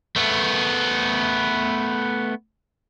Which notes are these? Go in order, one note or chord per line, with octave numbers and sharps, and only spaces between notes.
A3 B3